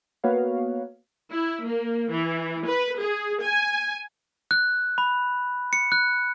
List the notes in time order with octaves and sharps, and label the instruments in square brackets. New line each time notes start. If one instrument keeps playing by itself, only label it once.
[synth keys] A#3 B3 F#4 B4 C#5 F5
[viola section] E4
A#3
E3
B4
G#4
G#5
[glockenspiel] F#6
B5
C#7
F#6